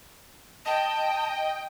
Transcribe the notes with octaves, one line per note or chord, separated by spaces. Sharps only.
D#5 G5 A5